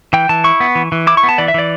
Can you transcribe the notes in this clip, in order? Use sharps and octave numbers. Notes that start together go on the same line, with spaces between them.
E3 G5
E3 A5
E4 C#6
B3
E3
E3
E4 D6
C#6
B3
A5
E3 D5
E5
E3 D5